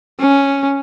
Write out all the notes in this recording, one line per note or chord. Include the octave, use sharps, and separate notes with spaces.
C#4